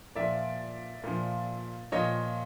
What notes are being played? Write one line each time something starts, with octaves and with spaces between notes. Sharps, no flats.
A#2 F3 D5 E5
A#2 F3
A#2 F3 C#5 D#5